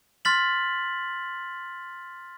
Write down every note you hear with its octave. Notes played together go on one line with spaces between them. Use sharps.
C6 F6 A6 B6 F#7